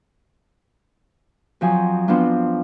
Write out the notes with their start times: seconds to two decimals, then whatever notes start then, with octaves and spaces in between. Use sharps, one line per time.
1.61 F2 F3 F#3 G#5 D#6
2.08 F3 B3 C4 D4 F4